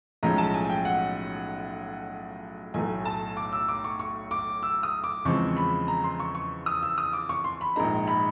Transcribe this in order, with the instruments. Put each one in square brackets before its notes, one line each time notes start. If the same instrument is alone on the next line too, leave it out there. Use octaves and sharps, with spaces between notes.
[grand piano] B1 A2 F3 G#3 C#4 A#5
A5
G#5
G5
F#5
B1 A2 F#3 A3 G#5
A5
D6
E6
D6
C#6
C#6
D6
E6
D#6
D6
E2 C#3 F3 G#3 C4 C#6
B5
A#5
C6
C#6
C#6
D#6
E6
D#6
D6
C#6
C6
B5
A#1 G#2 D#3 G#3 A#5
B5